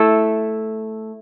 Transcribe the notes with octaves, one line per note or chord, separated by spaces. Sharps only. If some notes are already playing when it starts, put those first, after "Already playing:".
Already playing: A3 E4 A4